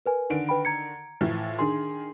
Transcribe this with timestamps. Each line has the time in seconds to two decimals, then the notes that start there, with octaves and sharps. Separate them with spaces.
0.06 A#4 B4 G#5
0.30 D3 D#3 D7
0.49 B4 G5 B5
0.65 A#5 G#6 C#7
1.21 A2 E3 F3
1.59 D#3 D4 G#4 C6